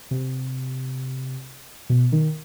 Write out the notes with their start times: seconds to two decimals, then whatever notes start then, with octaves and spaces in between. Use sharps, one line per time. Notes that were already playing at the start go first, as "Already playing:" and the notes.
0.11 C3
1.90 B2
2.12 D#3